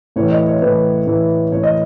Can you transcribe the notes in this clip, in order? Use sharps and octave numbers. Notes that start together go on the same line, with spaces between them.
A2 E3 C#5
D#5
C#5
A2 E3 B4
A2 E3
A2 E3 C#5
D#5